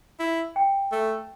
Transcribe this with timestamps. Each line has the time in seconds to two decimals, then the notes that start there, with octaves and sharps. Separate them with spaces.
0.19 E4
0.56 G5
0.92 A3